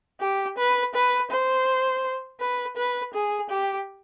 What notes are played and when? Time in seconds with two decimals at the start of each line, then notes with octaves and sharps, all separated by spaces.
0.21 G4
0.58 B4
0.94 B4
1.31 C5
2.40 B4
2.76 B4
3.14 G#4
3.50 G4